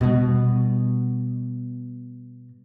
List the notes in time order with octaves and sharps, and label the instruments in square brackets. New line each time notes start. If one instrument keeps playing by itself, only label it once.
[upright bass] B2 G3